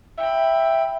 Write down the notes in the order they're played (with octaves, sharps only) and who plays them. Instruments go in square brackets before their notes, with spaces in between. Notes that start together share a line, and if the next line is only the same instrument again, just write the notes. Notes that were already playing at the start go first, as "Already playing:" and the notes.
[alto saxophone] E5 [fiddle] G5 B5